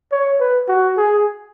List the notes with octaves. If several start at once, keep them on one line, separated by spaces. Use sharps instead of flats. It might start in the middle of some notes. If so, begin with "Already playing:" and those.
C#5
B4
F#4
G#4